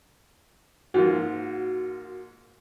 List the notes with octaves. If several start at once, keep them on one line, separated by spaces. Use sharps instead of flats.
G#2 F3 A#3 F#4